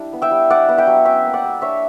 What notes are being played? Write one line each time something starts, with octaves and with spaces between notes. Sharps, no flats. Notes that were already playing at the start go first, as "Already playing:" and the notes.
Already playing: G3 D4 E4
B3
E5 G5
G3
D4 D5 F#5
B3
E5 G5
F#3
C#4 E5 G5
A#3
D5 F#5
G3
D4 C#5 E5